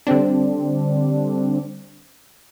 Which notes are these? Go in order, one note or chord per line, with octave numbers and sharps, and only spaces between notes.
D3 G3 C4 D4